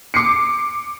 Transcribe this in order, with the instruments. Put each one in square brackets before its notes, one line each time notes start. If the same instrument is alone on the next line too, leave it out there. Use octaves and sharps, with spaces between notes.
[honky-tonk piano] D6 C7 C#7